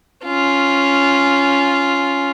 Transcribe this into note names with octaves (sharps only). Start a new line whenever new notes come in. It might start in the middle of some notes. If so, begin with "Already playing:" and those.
C#4 F4